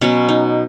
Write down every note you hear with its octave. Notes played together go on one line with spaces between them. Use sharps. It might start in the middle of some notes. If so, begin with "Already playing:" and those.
B2 F#3 B3 C#4
D#4